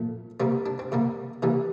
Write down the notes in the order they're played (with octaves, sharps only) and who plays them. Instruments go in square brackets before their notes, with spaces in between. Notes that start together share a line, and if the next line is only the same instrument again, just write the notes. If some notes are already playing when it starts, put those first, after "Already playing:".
Already playing: [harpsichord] A#2 F3 A3
C3 G3 A#3 C4
D4
C4
C3 G3 A#3
C3 E3 G3 A#3